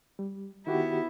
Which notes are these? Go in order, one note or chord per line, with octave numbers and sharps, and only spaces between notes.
G3
D#3 B3 E4 F#4 G4